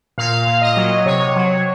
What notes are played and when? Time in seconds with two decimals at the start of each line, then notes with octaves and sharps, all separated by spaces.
0.18 A#2 F5
0.47 A#2
0.62 D#5
0.77 F#3
1.06 C3 C#5
1.36 F#3